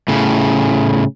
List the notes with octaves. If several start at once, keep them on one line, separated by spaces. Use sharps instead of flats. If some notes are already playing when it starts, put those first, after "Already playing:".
A2 C#3